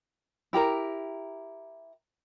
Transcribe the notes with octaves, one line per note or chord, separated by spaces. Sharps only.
E4 G4 A#4 A#5